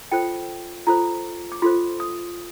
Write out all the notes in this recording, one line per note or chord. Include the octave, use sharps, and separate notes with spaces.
F4 A4 C5 G5
F4 A4 C5 A#5
D6
F4 A4 C5 C6
D#6